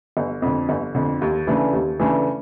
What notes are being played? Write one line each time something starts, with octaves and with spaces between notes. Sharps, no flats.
G1
F2 D3
G1
F2 D3
D#2
C#3 E3 A3 D4
D#2
C#3 E3 A3 D4